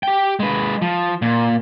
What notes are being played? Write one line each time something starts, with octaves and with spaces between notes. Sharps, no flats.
G4 G5
G#3 B4
F3
A#2